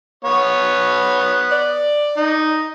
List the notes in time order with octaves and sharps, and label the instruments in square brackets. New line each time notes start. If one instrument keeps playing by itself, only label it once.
[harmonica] B3 C#5
[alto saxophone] D5
[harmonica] D#4